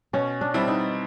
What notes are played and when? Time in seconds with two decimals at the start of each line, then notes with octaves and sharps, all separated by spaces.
0.13 B2 C#4
0.41 D4
0.54 G3 C4 E4
0.68 D#4